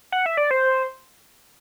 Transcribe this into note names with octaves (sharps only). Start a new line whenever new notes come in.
F#5
E5
D5
C5